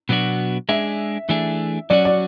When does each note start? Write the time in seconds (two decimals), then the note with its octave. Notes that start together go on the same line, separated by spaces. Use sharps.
0.09 B2 F#3 B3 D4 F#4
0.69 G#3 D4 G#4 E5
1.29 E3 A3 D4 G#4
1.90 F#3 C#4 F#4 D5
2.05 D5